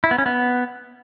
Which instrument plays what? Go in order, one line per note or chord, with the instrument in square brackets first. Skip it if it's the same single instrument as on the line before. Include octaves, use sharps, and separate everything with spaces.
[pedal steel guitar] E4
B3
C#4
B3